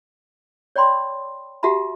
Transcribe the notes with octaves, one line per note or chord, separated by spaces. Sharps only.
C#5 D5 G5 B5 C6
F#4 G4 E5 F#5 A5 B5